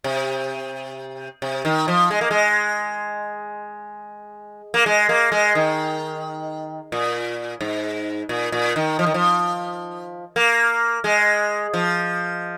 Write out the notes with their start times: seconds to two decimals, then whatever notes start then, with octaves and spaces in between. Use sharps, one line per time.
0.04 C3
1.42 C3
1.65 D#3
1.88 F3
2.10 G#3
2.21 A#3
2.31 G#3
4.74 A#3
4.86 G#3
5.09 A#3
5.32 G#3
5.55 D#3
6.92 A#2
7.61 G#2
8.29 A#2
8.52 A#2
8.76 D#3
8.99 F3
9.06 D#3
9.14 F3
10.36 A#3
11.04 G#3
11.73 F3